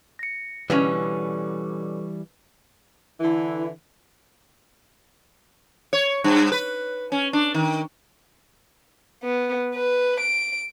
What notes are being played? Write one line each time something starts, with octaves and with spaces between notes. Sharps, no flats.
A#6 C#7
B2 D3 E3 G3 C#4 B4 C#6
D3 E3 E4
C#5
G2
B4
C#4
D4
D#3
B3
B4
D7